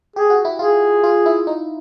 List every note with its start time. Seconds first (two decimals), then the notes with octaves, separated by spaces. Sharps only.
0.16 G4 G#4
0.30 F#4
0.45 E4
0.59 F4 G#4
1.04 F4
1.26 E4
1.47 D#4